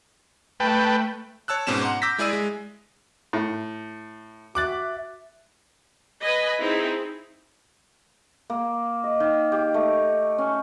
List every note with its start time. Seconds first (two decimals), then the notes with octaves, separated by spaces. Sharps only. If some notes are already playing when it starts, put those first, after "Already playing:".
0.60 A3 B4 G5 A5
1.48 C#5 A5 E6 F#6
1.67 G#2 B2 C4 C#4 E7
1.82 F#5 A#5 C6 D6
2.02 D6 E6 G6 A#6 B6
2.18 G#3 E4 G#4 D5 E6 D#7
2.33 G#3
3.33 A2
4.55 F#4 E5 D6 F#6 A6
6.23 B4 D#5 G#5 B5
6.60 C4 D#4 E4 G#4
8.50 A#3
9.04 D#5
9.20 D#3
9.52 G4
9.74 A3
10.38 C#4